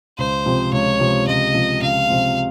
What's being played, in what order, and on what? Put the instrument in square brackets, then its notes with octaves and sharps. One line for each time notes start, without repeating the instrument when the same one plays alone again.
[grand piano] C#2 [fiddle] C5
[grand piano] C3 F3 C4
[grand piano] C#2 [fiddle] C#5
[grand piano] C3 F3 C4
[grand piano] C#2 [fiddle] D#5
[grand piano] C3 F3 C4
[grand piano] C#2 [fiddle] F5
[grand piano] C3 F3 C4